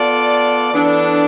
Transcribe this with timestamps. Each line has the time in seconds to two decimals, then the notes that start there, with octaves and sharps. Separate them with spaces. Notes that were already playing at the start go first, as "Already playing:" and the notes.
Already playing: B3 F4 A4 D5
0.71 E3 B3 D4 A4